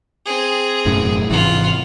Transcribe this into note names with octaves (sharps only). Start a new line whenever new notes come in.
C4 G#4
E1 F#2 A2
G#1 C3 E3 F4 F#5